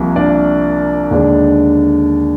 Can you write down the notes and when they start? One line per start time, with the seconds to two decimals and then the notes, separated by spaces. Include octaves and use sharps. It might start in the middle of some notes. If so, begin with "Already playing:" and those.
Already playing: C2 C3 F3 A#3
0.16 D4 D5
1.11 D#2 D3 G#3 D4